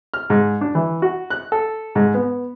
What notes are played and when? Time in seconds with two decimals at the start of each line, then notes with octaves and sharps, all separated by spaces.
0.14 F6
0.30 G#2
0.61 D4
0.75 E3
1.02 F#4
1.30 F#6
1.52 A4
1.95 G#2
2.14 B3